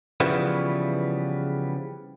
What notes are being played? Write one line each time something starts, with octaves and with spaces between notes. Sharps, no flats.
C#3 E3 F3 G3 B3